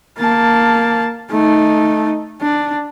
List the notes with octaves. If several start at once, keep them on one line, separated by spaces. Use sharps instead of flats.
A#3 A5
A3 D#4
D4